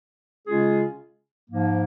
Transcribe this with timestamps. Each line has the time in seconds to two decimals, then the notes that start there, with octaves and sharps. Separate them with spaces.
0.47 C#3 G#3 C#4 F4 G#4
1.51 G#2 F3 A#3